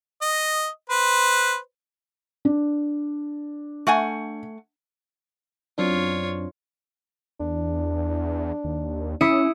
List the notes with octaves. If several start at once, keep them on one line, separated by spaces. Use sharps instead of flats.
D#5
B4 C5
D4
A3 F#5 G#5
F#2 C4 D4 F4 C#5
E2 D4
D#2
C#4 E4 D#6 C#7